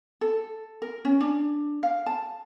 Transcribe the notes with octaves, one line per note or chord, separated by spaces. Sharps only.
A4
A#4
C#4
D4
F5
A5